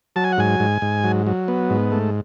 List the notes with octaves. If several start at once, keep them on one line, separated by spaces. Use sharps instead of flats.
F#3 A5
G#5
F#5
G#2 G#5
G#2
G#2
F#3
F#3
B3
G#2
A3